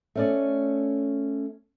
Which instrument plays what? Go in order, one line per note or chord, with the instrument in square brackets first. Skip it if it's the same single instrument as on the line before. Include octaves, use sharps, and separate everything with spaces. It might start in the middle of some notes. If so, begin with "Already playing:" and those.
[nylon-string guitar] A3 C#4 D5